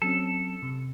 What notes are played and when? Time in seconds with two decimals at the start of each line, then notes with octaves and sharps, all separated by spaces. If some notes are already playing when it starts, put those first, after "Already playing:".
0.02 F#3 C4 C#4 A4
0.62 C3